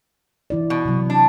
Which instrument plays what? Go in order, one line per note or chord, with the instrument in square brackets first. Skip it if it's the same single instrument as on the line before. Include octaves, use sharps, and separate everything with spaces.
[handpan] E3 E4 D5
[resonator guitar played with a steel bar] B2
[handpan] C3 F#3
[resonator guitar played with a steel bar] D4